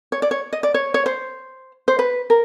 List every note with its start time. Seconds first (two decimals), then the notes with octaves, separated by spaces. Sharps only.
0.12 C#5
0.22 D5
0.31 C#5
0.53 D#5
0.63 D5
0.74 C#5
0.94 C#5
1.06 C5
1.88 C5
1.99 B4
2.30 A#4